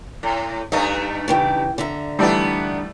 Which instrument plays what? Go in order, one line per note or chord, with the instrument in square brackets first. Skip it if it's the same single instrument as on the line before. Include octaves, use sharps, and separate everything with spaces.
[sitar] A2
[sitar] G2 A3 D#4 [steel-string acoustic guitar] D#5 F5
[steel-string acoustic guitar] C#3 E3 G4
D3 E5 A#5
[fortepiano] E3 G3 A3 [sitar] B3 D4 D#4